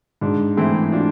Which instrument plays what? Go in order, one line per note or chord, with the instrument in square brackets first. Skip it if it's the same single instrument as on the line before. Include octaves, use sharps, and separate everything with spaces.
[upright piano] G#2 [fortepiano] D4
[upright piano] E3 A3 [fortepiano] C4 E4
[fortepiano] D4 F4